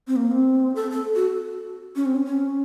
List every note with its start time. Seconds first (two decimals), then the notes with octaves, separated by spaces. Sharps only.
0.08 C4
0.16 A#3
0.31 C4
0.76 A4
0.91 A4
1.15 F#4
1.96 C#4
2.06 C4
2.15 C#4
2.25 C#4